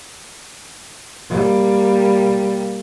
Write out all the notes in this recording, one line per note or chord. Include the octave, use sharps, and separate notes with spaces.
G3 A#3